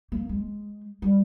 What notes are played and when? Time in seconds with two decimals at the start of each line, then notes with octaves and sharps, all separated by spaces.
0.12 A#3
0.29 G#3
1.02 G3